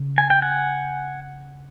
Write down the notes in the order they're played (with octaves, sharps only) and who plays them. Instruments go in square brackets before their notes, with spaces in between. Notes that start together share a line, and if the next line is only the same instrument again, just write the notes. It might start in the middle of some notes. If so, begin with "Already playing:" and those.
Already playing: [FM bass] C#3
[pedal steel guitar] G#5
G5
F#5 G#5